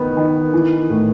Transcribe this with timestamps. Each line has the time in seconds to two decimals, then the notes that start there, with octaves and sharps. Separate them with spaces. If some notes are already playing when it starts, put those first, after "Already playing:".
Already playing: D#3 B3
0.17 D#3
0.54 E3
0.90 A2